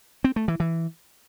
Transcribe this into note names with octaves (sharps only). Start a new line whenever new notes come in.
C4
A3
E3
E3